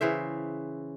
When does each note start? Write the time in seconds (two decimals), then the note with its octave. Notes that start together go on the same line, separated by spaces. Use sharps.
0.01 C#3 E3 C5 E5